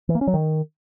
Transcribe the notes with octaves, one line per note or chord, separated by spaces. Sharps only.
E3
A#3
C#4
F#3
D#3